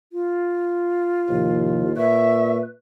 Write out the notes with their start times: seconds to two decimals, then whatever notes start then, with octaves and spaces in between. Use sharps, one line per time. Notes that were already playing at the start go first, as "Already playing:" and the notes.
0.13 F4
1.29 D#2 A2 C3 F3
1.97 A#2 B4 E5 C#6